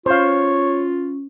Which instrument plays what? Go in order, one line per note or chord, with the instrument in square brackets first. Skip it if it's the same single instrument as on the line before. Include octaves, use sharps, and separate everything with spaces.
[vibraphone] C#4 [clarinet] F4 [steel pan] C5 F5 [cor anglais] C#5